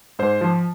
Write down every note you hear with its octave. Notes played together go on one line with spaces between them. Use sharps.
G#2 C5
F3